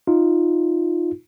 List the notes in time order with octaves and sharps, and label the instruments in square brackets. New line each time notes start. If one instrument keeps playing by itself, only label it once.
[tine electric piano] D#4 F4